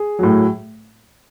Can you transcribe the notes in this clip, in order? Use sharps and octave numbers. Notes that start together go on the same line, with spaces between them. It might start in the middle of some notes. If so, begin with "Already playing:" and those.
Already playing: G#4
A2 F#3